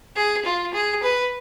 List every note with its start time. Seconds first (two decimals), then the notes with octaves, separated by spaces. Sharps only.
0.16 G#4
0.45 F4
0.74 G#4
1.03 B4